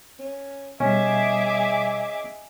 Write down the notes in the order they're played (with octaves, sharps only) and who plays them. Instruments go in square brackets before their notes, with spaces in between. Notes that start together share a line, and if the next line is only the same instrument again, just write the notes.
[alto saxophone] C#4
[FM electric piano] B2 G3 [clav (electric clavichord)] C#4 [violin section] G#4 E5 D6 [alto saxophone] D#5